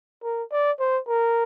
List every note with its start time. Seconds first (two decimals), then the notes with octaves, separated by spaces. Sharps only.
0.23 A#4
0.52 D5
0.80 C5
1.07 A#4